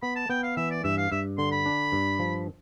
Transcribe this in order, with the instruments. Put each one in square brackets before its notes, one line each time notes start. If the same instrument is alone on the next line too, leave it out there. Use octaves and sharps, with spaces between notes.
[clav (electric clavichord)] B3 [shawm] B5
[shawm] A5
[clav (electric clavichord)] B3 [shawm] G5
[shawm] F5
[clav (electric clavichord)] E3 [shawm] E5
[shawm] D5
[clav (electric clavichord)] G2 [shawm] E5
[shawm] F5
[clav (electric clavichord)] G2 [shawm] E5
[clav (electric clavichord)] D3 [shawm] C6
[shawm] B5
[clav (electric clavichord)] D4
G2
F3